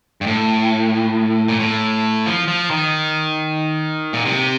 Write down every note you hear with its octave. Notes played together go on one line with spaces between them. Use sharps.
G2
A2
A#2
A2
F3
F3
D#3
A#2
C3